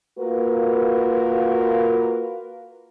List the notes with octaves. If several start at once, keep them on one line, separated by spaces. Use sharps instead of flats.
A#3 F4 F#4 A#4 B4